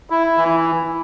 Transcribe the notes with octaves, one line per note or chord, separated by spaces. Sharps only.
E4
E3